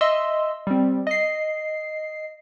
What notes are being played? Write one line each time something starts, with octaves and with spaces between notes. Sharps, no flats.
D#5 E5 C6 E6
G3 C4
D#5 C7